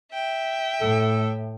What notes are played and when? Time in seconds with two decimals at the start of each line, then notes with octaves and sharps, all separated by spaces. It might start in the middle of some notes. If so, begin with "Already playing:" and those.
0.13 E5 G5
0.81 A2 A4